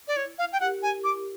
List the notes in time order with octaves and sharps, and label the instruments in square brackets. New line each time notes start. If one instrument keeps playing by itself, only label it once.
[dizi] D5
[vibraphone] E4 [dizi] C#5
[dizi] F5
G5
[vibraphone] G4 A#4 [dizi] F#5
[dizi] G#5
[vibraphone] E4 [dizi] D6